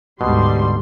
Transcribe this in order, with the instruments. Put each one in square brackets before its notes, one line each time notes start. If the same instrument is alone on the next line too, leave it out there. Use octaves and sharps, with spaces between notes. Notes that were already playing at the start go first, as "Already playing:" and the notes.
[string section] D2 G3 C6 [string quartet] G#2 [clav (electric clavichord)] B2